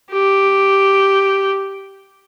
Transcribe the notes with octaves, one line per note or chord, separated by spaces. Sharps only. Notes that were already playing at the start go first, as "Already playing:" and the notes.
G4